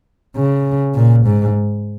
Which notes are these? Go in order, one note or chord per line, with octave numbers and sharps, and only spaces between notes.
C#3
A#2
G#2